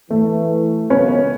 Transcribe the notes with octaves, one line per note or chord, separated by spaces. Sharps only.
E3 A3
C#2 F#2 B3 C#4